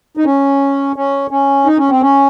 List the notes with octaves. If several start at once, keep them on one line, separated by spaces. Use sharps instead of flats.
D#4
C#4
C#4
C#4
D#4
C#4
C4
C#4